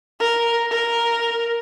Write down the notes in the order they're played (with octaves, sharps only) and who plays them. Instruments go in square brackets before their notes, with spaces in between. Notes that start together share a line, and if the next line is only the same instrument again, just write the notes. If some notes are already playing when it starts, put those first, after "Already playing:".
[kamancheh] A#4
A#4